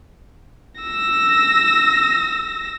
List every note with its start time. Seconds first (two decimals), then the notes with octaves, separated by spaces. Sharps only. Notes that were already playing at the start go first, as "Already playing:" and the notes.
0.82 E6 A#6